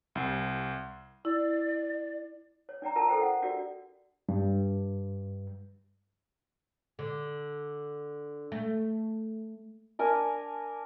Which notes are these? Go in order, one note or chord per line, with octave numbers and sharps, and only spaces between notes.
C2
E4 D5
C#5
D4 D5 G5 A#5
F4 A#4 A5 A#5
A4 A#4 C5 G5
F#5
D4 F#4 G4 A#4 D5
G2
D3
A3
D4 A#4 G#5